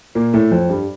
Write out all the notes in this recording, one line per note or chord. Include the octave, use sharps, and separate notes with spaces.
A#2 A#3
A2 A3
F2 F3
G2 G3